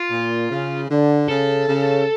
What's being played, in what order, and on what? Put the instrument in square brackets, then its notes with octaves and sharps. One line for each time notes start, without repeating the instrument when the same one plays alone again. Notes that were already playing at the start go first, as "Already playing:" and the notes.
Already playing: [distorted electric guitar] F4
[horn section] A#2
C#3
D3
[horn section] C#3 [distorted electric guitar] A4
[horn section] C#3